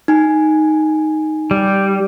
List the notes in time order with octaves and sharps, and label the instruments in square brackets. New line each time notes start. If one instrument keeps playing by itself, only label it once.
[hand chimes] D#4 G#5
[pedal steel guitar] G3